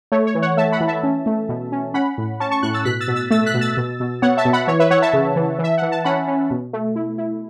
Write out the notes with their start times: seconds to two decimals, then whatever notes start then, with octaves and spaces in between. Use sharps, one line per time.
0.12 A3 C#5
0.27 C#5
0.35 E3
0.42 C#5 F#5
0.57 A3 E5 A5
0.72 F#5 B5
0.81 E3
0.88 E5 A5
1.03 C#4
1.26 A3
1.49 B2
1.72 C#4
1.94 C#4 F#5 B5
2.18 A2
2.40 C#4 A5 C#6
2.51 A5 C#6
2.63 A2 C#6 F#6
2.74 E6 A6
2.85 B2 F#6 B6
3.00 E6 A6
3.08 B2
3.16 E6 A6
3.31 A3 E6 A6
3.46 F#6 B6
3.54 B2
3.61 E6 A6
3.77 B2
4.00 B2
4.22 B3 C#5 F#5
4.37 E5 A5
4.45 B2
4.53 F#5 B5
4.68 E3 C#5
4.80 B4 E5
4.91 E3 C#5 F#5
5.02 E5 A5
5.13 C#3
5.36 E3
5.59 E3
5.64 E5
5.78 E3 F#5
5.92 A5
6.05 C#4 F#5 B5
6.28 C#4
6.50 B2
6.73 A3
6.96 E4
7.18 E4